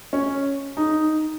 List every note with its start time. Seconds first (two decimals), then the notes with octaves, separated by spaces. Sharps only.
0.13 C#4
0.77 D#4